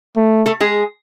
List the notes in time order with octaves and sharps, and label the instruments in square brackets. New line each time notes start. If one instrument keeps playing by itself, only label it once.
[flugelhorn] A3
[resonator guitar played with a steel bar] A3 A4
G#3 G#4